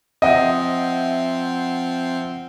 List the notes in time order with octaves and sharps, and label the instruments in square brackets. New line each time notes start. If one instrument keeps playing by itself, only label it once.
[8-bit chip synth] F3 C4 [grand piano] D#5 [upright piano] E5 F#5